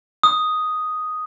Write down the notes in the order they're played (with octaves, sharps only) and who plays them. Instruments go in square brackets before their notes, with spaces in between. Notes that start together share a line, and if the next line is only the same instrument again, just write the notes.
[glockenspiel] D#6